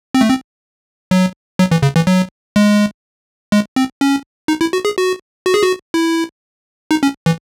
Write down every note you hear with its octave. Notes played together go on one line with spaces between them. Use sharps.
C4
A3
C4
F#3
F#3
E3
C#3
E3
F#3
G#3
G#3
C4
C#4
D#4
E4
F#4
G#4
F#4
F#4
G#4
F#4
E4
D#4
C#4
E3